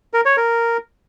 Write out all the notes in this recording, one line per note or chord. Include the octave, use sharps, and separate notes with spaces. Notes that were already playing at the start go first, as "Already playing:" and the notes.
A#4
C#5
A#4